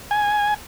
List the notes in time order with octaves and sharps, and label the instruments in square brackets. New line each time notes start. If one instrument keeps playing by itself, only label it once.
[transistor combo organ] G#5